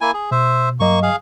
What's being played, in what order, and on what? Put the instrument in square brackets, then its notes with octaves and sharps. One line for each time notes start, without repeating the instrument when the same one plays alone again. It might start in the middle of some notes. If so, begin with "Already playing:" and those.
[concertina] A#3 E4 G#5
G#4
[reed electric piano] B2 [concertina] C5 E5
[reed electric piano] G2 F#3 D#5 [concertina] A#3 C#6
[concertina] G#4 F5